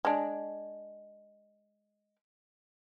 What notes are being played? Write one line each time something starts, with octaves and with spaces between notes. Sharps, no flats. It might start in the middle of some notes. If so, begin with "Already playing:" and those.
G#3 D4